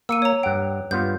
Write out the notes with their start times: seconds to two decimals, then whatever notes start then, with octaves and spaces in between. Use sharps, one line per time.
0.09 A#3 E6 C#7 D#7
0.22 C#5 A#5
0.43 G2 F#5 G5
0.91 G2 B3 F4 G6